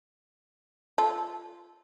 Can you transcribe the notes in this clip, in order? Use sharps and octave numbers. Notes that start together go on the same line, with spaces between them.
F4 A4